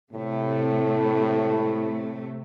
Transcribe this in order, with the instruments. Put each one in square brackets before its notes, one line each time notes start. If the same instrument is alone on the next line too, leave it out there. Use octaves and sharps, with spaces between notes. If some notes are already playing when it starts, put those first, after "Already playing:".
[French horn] A2 [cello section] C3 A3